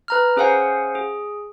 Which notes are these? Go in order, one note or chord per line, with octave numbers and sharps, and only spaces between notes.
B4 A#5 F6
C#4 G#4 C5 F5 F#5 G#5
G#4